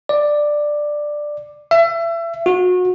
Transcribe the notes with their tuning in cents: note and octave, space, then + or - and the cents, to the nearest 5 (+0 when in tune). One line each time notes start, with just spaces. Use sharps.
D5 +10
E5 +30
F#4 -30